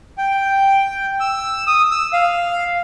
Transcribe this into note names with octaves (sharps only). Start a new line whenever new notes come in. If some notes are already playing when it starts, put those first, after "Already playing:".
G5
E6
D#6
E6
F5